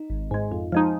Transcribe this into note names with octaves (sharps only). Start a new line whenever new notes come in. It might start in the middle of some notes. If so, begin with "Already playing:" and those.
Already playing: D#4
G#1
G#2 G#3
F2
F3 G#3 D#4